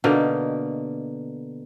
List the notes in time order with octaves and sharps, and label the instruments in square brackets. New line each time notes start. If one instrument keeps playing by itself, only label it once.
[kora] B2 D3 A#3 D#4